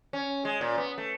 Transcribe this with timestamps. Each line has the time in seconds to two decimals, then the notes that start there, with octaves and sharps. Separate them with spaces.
0.13 C#4
0.45 G#3
0.61 A#2
0.78 B3
0.98 A3